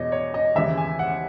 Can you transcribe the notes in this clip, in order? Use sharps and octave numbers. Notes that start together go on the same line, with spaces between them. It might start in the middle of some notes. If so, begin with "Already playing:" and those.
Already playing: E2 B2 C#5 D#5
C#5
D#5
D#2 C#3 E3 E5
G#5
F#5